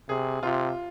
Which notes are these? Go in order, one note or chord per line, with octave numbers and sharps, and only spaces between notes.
C3 G#4
C3 F4